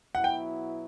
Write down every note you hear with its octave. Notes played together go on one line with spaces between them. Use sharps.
B2 F#3 B3 E4 F#5
G5